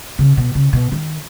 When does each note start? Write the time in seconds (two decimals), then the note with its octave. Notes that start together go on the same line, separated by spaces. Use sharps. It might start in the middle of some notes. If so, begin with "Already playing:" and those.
0.19 C#3
0.37 B2
0.55 C#3
0.73 B2
0.92 D#3